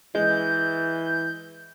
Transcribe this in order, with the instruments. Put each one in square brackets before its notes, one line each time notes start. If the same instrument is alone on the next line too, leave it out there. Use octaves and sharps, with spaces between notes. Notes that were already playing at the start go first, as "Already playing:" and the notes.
[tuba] E3 [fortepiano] G#3 [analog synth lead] G6